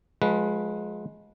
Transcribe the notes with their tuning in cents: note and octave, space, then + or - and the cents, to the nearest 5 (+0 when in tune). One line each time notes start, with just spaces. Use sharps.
F3 +35 G#3 +15 B4 -15